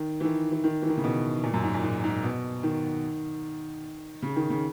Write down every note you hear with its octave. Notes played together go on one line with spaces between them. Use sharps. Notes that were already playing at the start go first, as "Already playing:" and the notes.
Already playing: D#3
E3
D#3
E3
D#3
E3
D#3
C#3
B2
A#2
F#2
G#2
A#2
G#2
G#2
B2
D#3
C#3
D#3
C#3